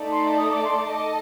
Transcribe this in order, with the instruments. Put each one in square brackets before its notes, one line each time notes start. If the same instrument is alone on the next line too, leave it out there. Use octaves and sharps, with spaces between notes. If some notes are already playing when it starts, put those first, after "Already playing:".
Already playing: [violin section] A3 D#4 A4 D5
[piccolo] C6
D#6
D6
C6
D6
[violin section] A4 D#5